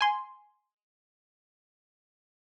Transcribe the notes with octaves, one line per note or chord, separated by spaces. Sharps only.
G#5 C6